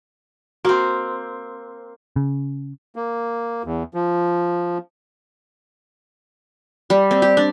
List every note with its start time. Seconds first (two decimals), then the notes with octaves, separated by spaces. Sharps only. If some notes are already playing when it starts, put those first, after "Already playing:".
0.65 A#3 C4 F#4
2.16 C#3
2.96 A#3
3.65 E2
3.94 F3
6.90 G3
7.11 C4
7.22 G4
7.37 D4